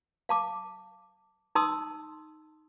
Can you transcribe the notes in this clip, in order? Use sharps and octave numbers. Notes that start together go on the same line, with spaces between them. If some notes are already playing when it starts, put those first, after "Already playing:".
F5 A5 D6
D#4 A5 C6 D#6 E6